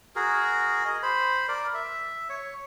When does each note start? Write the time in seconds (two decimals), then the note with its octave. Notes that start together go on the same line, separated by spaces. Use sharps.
0.16 F#4 G#4 A#4
0.85 D#5
1.03 C5 B5
1.48 A#4 D5
1.74 E5
2.29 C#5